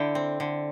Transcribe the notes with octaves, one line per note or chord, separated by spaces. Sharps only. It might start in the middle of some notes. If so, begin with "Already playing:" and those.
Already playing: D3 E4 G5
C4
D3